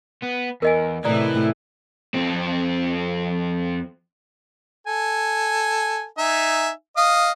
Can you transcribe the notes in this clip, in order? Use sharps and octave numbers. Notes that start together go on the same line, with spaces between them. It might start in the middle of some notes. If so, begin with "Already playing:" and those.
B3
E2 A#4 D#5 G#5
A2 C3 E3 E4 D5 A#5 D#6
F2 C4
A4 G#5
D#4 E5 G#5
D#5 F5 D#6